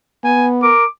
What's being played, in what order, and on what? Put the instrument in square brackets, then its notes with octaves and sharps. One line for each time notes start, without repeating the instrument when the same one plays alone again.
[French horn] B3 [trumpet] G#5
[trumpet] A#4 [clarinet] D6